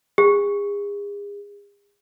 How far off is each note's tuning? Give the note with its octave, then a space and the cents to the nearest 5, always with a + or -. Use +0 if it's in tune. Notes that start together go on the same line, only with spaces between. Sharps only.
G#4 -35